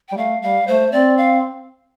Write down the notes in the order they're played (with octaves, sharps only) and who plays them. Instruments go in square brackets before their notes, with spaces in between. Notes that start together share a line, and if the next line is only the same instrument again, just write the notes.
[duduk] G3 [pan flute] G5
[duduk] A3 [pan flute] F5
[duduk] G3 [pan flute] F5
[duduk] A3 [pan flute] C5
[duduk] C4 [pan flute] D5
[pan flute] F5